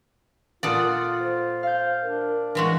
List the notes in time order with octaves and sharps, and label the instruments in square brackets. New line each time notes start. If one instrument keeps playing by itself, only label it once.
[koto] A#2 A4 D5 [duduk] F4 [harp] F#5 D#6
[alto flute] C5
[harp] F5 G6
[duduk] D4 [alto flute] A#4
[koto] E3 G#3 F#4